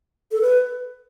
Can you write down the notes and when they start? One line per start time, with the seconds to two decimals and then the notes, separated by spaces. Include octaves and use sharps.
0.32 A4
0.41 B4